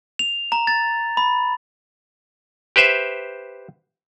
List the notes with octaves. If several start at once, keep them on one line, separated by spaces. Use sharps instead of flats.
F7
A#5
A6
B5
G4 B4 C5 E5